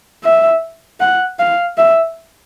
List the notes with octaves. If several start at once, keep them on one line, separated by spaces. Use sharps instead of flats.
E5
F#5
F5
E5